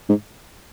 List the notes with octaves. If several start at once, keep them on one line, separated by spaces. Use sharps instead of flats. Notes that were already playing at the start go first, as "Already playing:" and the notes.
G#2